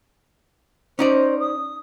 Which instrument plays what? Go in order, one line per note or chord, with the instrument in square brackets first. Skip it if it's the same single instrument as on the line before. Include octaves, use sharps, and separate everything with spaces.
[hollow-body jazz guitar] C#4 D#4 D5 [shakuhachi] C5
[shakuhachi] D#6